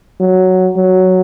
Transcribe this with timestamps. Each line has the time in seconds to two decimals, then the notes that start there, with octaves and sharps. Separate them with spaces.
0.21 F#3
0.76 F#3